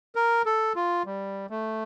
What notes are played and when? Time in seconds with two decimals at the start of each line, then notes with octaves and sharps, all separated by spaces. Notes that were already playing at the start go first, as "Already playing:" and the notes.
0.15 A#4
0.46 A4
0.76 F4
1.06 G3
1.50 A3